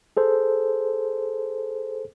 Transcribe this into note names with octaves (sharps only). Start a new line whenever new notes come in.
G#4 A4 C5